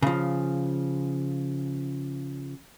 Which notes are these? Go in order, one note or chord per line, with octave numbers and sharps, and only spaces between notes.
C#3 F3